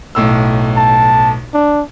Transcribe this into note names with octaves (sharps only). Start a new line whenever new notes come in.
B1 A2 E6
A5
D4